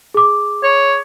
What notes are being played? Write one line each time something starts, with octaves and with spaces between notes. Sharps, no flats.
G#4 D6
C#5